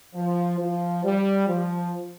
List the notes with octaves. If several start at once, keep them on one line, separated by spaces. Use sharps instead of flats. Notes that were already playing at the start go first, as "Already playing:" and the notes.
F3
F3
G3
F3